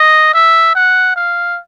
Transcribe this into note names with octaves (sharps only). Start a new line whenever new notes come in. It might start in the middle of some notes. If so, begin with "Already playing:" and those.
Already playing: D#5
E5
F#5
F5